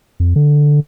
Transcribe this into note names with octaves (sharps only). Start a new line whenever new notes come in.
F2
D3